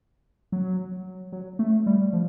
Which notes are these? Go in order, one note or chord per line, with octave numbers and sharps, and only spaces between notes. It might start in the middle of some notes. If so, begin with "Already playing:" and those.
F#3
F#3
A3
G3
F3